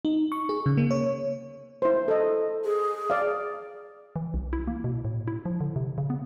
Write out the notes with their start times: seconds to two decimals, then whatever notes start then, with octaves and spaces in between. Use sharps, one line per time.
0.05 D#4
0.32 C#6
0.49 G#4
0.66 C#3
0.77 A#3
0.91 C#5
1.82 E4 C5
2.08 A4 D#5
2.65 G#4
3.10 D5 F5
4.16 E3
4.34 C2
4.53 E4
4.67 A#3
4.84 B2
5.05 A2
5.28 E4
5.45 F3
5.61 D3
5.76 C3
5.98 C#3
6.10 B3